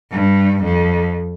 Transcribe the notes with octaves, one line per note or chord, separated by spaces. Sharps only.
G2
F2